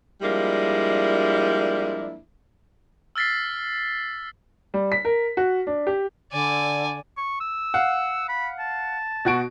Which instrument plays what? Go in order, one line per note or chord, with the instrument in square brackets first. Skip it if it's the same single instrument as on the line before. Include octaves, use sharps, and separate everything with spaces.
[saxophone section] F3 G3 G#3 A#3 D4 E4
[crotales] E6 F6 A6 B6 C7
[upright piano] G3
B6
A#4
F#4
D4
G4
[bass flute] D3 [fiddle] D5 G#5
[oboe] C#6
E6
[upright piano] F5 F#5
[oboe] B5
A5
[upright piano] B2 F#4 D7